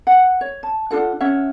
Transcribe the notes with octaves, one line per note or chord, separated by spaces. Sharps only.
F#5
C#5
A5
D4 F4 A4 F#5
C#4 C#5 E5 F#5